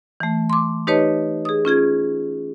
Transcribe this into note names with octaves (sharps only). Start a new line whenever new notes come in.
E3 A3
C6 D6
D#4 G4 B4 C#5 D#5 A5
G#4 D#6
C#4 F4 G#4 G#6